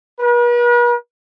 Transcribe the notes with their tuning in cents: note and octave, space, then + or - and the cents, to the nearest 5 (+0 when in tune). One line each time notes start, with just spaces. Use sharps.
B4 -45